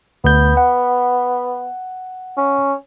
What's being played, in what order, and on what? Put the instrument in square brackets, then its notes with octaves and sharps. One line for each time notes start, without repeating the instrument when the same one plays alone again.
[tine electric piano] D2 G6 [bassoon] B3
[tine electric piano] F#5
[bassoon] C#4